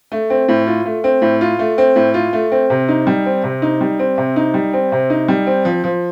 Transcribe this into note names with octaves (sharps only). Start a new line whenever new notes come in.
A3
C4
A2
F4
A3
C4
A2
F4
A3
C4
A2
F4
A3
C4
C3
D#4
G3
C4
C3
D#4
G3
C4
C3
D#4
G3
C4
C3
D#4
G3
C4
F3
F3